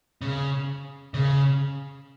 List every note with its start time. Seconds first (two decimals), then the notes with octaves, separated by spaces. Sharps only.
0.22 C#3
1.14 C#3